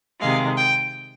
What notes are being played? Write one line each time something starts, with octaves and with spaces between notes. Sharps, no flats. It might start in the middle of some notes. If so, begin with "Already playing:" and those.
C3 D#3 G#3 F5
G5